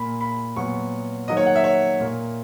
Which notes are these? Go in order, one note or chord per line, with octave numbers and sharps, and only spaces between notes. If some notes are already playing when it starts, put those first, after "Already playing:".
Already playing: A#2 A#3 B5
B5
A#2 F#3 B3 C#6
D#3 F#3 A#3 D#5
C#5
F#5
E5
C#5
A#2 A#3